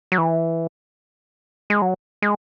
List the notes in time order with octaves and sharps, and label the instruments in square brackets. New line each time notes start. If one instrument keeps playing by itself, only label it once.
[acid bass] F#3
E3
G#3
F#3
G#3